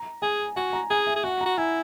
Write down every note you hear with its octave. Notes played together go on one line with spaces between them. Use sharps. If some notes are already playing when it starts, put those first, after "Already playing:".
Already playing: A#5
G#4 G#5
F#4 G#5
A#5
G#4 G#5
E5
G#4
F#4 F#5
F#4 A#5
E4 G#5